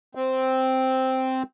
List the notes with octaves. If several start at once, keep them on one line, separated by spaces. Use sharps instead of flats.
C4